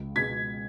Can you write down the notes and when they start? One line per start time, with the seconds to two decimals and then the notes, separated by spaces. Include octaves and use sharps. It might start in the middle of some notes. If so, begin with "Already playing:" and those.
Already playing: C#2
0.16 B2 G#3 G#6 B6